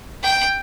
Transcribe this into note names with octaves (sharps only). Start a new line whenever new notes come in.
G5